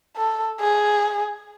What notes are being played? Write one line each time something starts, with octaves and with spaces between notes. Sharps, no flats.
A4
G#4